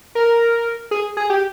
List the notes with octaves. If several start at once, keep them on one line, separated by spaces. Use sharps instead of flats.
A#4
G#4
G#4
G4